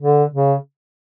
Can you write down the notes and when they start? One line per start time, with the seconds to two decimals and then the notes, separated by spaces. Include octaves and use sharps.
0.02 D3
0.33 C#3